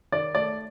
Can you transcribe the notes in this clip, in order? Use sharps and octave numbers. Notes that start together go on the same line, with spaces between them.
D#3 D5
A3 D5